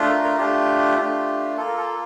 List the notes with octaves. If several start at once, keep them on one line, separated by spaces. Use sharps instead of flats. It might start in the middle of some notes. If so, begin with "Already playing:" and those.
Already playing: A3 D4 F4
A#4
A#4
A3 D4 F4 G4
A3 D4 F4
A#3 F4 A4
A#4
A4